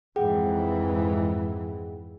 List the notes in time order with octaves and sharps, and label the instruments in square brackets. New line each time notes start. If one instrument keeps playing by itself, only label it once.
[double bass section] F2 G#2 E3 [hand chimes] G#4 F#5 G5